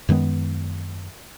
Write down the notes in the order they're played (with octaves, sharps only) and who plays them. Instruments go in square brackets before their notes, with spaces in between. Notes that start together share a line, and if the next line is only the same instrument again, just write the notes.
[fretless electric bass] F#2 D#3 G#3 B3